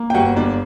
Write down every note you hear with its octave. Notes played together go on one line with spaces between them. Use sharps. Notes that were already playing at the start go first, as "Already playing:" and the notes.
Already playing: A#3
G5
G1 F#4 F#5
G1 D4 D5